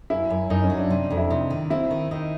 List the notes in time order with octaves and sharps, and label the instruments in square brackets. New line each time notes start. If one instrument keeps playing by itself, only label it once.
[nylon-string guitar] F#2 [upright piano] E4
[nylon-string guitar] F#2
[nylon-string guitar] F#2 [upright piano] D#4
[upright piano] C#4
[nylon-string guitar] F#3
[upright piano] D4
[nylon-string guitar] C3
F2
[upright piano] E4
[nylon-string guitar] C3 [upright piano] D#4
[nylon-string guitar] D#3
[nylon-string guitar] C4 [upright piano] E4
[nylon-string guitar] D#3
[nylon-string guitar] D#3 [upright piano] D#4